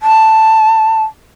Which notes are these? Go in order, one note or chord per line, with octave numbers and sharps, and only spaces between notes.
A5